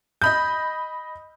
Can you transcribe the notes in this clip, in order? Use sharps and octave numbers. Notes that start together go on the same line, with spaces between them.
D#5 B5 G6